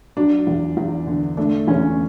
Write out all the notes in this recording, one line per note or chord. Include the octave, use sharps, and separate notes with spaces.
F#3 D4
E2
E2
D3
A3 D4
E2 C#4